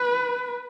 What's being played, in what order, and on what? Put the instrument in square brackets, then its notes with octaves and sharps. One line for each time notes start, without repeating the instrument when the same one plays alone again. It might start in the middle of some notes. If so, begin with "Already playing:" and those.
Already playing: [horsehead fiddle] B4